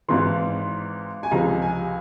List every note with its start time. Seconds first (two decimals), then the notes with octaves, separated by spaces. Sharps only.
0.08 G#1 G#2 E3 C6
1.23 G#5
1.31 C#2 C3 F3 G#3 A#5
1.62 G#5